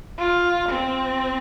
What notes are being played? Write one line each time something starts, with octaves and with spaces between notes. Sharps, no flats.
F4
C4